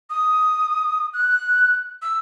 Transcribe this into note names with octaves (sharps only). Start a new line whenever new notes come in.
D#6
F#6
E6